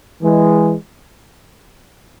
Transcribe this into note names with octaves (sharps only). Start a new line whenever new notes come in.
E3 G#3